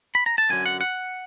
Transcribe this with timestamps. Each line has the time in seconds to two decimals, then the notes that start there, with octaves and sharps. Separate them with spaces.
0.15 B5
0.26 A#5
0.38 A5
0.50 F#2 D3 F#3 G#5
0.66 F#5
0.81 F#5